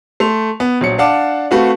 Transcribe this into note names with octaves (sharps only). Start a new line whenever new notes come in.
A3 C6 F7
B3
A#1 F#3 C#7
D4 F5 F#5 A5 D6
A3 C4 F#4 B4 F5